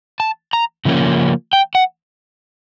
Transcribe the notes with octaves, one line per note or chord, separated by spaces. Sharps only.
A5
A#5
C#3 F3 A#3 C#4
G5
F#5